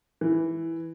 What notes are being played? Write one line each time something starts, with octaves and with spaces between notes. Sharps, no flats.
E3